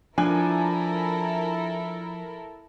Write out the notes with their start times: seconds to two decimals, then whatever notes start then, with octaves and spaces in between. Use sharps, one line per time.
0.18 F3 D4 E4 A4 A#4 G#5